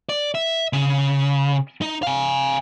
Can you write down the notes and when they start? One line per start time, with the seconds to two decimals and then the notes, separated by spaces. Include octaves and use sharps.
0.09 D5
0.35 E5
0.73 C#3
1.81 D#4
2.03 F5 G#5